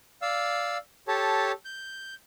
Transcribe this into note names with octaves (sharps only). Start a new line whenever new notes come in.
D5 F5 E6
G4 A4 C#5 A5
G6